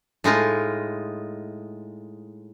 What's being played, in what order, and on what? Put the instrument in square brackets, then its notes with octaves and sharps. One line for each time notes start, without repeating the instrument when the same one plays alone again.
[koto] A2 G#3 D#4 F4